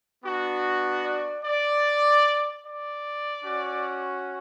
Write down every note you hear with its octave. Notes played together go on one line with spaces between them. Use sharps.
B3 D4 F#4
D5
D5
D5
C#4 F#4